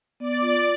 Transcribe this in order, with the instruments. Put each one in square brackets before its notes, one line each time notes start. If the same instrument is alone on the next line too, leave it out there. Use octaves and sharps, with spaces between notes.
[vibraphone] B3 [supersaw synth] D5
[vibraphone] F4